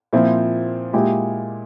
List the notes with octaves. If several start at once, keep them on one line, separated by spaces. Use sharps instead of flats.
A#2 F3 C4 E4
A#2 G#3 E4 G4